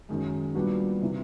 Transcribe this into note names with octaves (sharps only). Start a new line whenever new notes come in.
F#2 D#3 G#3
A#2 G3 B3 D4 F#4
C3 E3